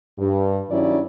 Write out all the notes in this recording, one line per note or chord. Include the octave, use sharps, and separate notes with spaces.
G2
G2 D#3 F#3 C#4 E4 D5